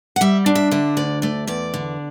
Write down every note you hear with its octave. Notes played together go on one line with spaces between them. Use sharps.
F#5
G3 E5
D4
E5
D3 E5
D2 D5
A3 D5
E2 D5
D3